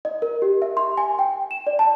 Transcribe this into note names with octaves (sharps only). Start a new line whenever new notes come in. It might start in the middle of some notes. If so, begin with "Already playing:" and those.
D#5
A#4
G4
E5
C6
G#5
G5
E7
D5
A5